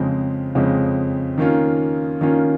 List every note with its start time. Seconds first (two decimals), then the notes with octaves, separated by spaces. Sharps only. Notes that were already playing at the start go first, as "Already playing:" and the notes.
Already playing: F2 C#3 G#3 C4
0.55 F2 C#3 G#3 C4
1.38 D#3 A#3 C#4 F4
2.21 D#3 A#3 C#4 F4